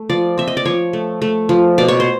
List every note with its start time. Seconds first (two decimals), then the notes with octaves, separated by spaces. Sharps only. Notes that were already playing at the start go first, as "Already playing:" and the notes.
Already playing: A3
0.09 F3 D5
0.38 C4 E5
0.48 D#5
0.57 D5
0.65 F3 C#5
0.93 A3
1.22 A3
1.49 F3
1.78 B2 D5
1.88 C#5
2.00 C5